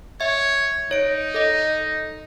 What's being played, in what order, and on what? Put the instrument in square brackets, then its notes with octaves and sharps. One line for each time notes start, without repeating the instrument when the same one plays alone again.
[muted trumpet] C#5 [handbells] E5
[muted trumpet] D#4 [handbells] C#5 D7
[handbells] A4 D#5